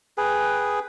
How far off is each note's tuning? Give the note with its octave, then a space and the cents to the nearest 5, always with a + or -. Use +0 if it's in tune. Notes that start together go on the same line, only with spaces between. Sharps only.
G#4 +0 B4 +0 G5 +0